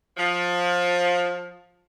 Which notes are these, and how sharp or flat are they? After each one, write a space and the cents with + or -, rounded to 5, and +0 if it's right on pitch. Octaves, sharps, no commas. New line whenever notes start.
F3 +20